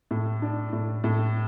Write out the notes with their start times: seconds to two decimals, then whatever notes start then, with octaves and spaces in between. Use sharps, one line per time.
0.11 A2
0.42 D4
0.73 A2
1.04 A2